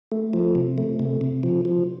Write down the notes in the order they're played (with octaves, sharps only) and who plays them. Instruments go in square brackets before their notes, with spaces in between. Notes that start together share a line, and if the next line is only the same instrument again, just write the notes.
[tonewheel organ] A3
F3
C3
A3
C3
C3
F3
F3